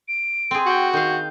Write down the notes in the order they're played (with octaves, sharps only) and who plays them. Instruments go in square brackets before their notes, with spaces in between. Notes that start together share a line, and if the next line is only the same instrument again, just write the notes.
[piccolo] D7
[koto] C4 G#4
[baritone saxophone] F#4 [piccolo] G5
[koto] D#3 F5 [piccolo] G6